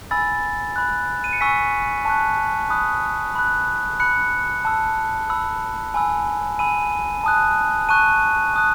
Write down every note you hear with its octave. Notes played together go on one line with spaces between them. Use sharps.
G#5 B5 E6 A6
B5 F#6
D#7
C#7
G#5 C#6 E6 B6
A5 C#6 F#6
B5 D#6 F#6
B5 F#6
B5 F#6 C#7
A5 E6
B5 E6
G#5 B5 E6
G#5 B5 E6 D#7
A5 D#6 F#6
A5 C#6 F#6 D#7
A5 D#6 F#6